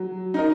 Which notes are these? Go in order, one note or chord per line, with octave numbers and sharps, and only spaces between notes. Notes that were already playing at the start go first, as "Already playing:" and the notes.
Already playing: F#3
D#4 A#4 D#5